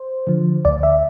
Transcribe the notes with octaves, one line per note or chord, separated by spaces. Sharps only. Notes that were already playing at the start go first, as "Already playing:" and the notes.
Already playing: C5
D3 F3
D2 D5
E5